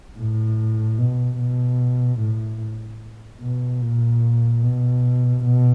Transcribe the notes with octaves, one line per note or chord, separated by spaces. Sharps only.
A2
B2
B2
A2
B2
A#2
B2
B2